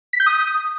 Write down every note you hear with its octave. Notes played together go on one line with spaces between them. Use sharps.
B6
G6
D#6